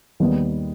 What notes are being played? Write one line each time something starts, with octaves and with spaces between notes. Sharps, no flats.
D#2 D#3 G3 B3